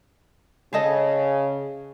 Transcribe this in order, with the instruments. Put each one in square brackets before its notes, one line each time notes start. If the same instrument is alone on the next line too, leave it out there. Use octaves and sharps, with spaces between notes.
[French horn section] C#3 [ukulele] G#4 A4 D#5